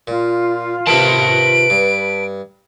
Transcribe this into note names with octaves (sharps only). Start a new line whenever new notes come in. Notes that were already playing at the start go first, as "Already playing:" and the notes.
A#2 F4
C3 D#3 B4 A5 D7
G2